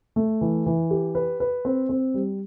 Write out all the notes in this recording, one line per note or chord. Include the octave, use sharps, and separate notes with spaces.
A3
E3
E3
G4
B4
B4
C4
C4
G3